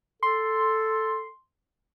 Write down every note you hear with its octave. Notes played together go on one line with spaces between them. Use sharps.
A4 C6